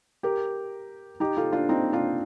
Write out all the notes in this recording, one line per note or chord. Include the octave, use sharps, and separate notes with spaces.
G4 A#4
D#4 G4
F4 A4
D4 F4
C4 D#4
D4 F4